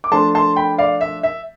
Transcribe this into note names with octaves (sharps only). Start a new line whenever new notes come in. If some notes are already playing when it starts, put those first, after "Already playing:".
D6
F3 A3 D4 F4 A5 C6
A5 C6
G5 B5
D5 F5
E5
E5